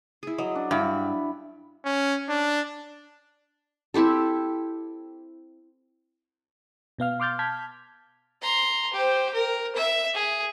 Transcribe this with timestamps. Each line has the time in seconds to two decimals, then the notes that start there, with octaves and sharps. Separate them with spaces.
0.23 E4 G#4
0.38 F#3 D#5
0.55 D4
0.71 G2 E4 F#4 B5
1.85 C#4
2.29 D4
3.94 C4 E4 G4 A4
6.98 B2 B3 F5 F6
7.20 C6 D6 F6 G6 A6
7.39 A5 F6 G6 G#6 B6
8.42 A#5 C6
8.93 G4 C5
9.34 A#4
9.76 E5
10.14 G#4